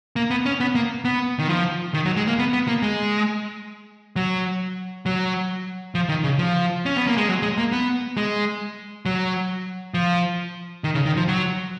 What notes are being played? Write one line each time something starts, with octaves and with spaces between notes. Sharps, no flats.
A#3
B3
C#4
B3
A#3
B3
D#3
F3
D#3
F#3
G#3
A#3
B3
B3
A#3
G#3
F#3
F#3
F3
D#3
C#3
F3
C#4
B3
A#3
G#3
F#3
G#3
A#3
B3
G#3
F#3
F3
D#3
C#3
D#3
F3
F#3